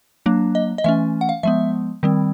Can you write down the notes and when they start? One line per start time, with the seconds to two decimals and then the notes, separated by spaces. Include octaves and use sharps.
0.26 F#3 A#3 D4
0.55 D#5
0.78 D#5
0.84 E3 A3 C#4 E5
1.21 F#5
1.29 F5
1.43 F3 G#3 B3 E5
2.03 D#3 G3 C4